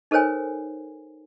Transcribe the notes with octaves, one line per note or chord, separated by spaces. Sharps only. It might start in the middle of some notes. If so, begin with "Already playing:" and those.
D#4 A4 A#4 C5 C#5 G#5